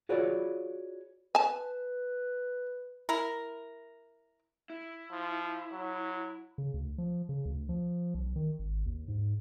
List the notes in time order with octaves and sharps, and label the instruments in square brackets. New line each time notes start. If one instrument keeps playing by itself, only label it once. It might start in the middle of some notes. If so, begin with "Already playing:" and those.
[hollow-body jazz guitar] F4 F#4 G#4 B4 C#5 D5
[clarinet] B4 [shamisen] G#5 A5
[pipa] E4 A#4
[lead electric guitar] E4
[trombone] F3
F#3
[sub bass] C#3
D2
F3
C#3
D2
F3
B1
D#3
G#1
D#2
G#2